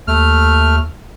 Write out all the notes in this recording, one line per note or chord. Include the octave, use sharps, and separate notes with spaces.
D#2 A3 F6